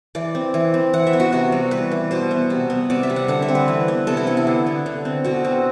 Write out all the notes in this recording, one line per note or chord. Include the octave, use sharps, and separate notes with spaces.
E3 D5
C4
E3
C4
E3 F#5
E5
B3
F#4
C3 F#4
G3
E3 B4
E3
B2 C5
B3
C3
B3
C3 D5
E5
G3
F#5
D3 F#5
E5
C4
B4
E3
B3
C3 A4
E4
B3
E4
D3
B3
D3
C4
B2 F#4
C4